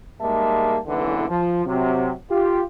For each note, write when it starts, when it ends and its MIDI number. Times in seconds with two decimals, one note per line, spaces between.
0.20 0.77 44
0.20 0.77 55
0.20 0.77 56
0.20 0.77 58
0.20 0.77 76
0.20 0.77 81
0.87 1.26 30
0.87 1.26 35
0.87 1.26 40
0.87 1.26 50
0.87 1.26 52
1.29 1.64 53
1.66 2.11 48
1.66 2.11 54
2.29 2.62 65
2.29 2.62 67